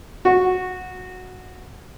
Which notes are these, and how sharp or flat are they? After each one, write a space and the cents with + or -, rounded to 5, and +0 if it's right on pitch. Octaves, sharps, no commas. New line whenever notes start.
F#4 -10